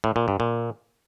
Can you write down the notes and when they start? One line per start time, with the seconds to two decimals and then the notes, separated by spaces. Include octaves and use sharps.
0.04 A2
0.16 A#2
0.28 G2
0.40 A#2